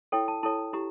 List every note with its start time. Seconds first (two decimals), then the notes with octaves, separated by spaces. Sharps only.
0.12 E4 A4 C#5 G5
0.28 A5
0.43 E4 A4 C#5 A5
0.73 E4 G4 A#5